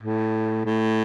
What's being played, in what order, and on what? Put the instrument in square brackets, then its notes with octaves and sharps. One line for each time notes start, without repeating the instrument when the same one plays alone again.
[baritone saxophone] A2
A2